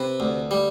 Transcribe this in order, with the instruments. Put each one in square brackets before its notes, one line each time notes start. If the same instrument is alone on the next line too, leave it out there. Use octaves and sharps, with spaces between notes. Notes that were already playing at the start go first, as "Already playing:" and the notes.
Already playing: [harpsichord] C3 B4
D2
G3